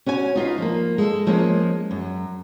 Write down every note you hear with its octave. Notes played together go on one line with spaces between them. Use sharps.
C#4 F#4 C#5 G#5
D#4 F4 B4 F5
F3 A#3
G#3 A4
F3 G#3 A#3 C#4
F#2